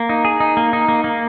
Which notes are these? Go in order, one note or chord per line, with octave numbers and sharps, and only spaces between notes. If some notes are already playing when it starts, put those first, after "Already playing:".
Already playing: A#3
D#4
G#4
D#4
A#3
D#4
A#3
A#3